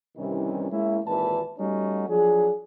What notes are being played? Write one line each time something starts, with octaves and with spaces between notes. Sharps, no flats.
C2 G2 C3 D#3 E3 C#4
G#3 A#3 C#4 E4
G#1 D#2 A#2 E3 B4 A5
G3 A3 C#4 D#4 F#4
F3 F#3 D4 G#4